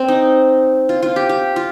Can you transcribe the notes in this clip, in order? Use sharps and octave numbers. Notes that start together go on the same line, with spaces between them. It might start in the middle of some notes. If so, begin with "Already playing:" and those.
Already playing: C4
D#4
F4
F4
G4
G4
F4